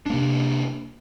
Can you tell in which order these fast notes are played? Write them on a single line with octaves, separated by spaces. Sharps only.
D4 A#3 C3